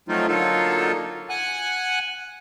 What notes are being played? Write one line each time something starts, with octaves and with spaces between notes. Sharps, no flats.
F3 F#3 A3 C4 D#4 F4
D3 F#3 A#3 D#4 F4 A4
F#5 G#5 F#6